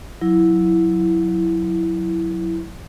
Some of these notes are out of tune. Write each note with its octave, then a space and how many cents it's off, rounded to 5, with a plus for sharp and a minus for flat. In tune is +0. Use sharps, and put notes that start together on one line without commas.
F#3 -20 E4 +0